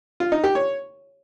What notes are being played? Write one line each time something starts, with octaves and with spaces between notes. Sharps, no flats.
F4
D#4
G4
C#5